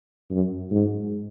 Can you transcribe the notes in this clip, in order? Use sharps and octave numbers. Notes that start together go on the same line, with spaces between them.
F#2
G#2